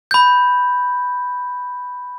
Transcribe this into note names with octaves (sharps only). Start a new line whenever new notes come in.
B5 G6